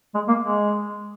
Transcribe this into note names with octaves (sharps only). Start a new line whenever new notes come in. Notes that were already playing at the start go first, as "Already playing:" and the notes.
G#3
A#3
G#3